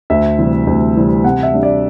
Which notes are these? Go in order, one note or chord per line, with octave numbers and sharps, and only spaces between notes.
D2 E5
C3 E3 G3 C4
D2
C3 E3 G3 C4
C3 F#5
E5
G3 D4
D5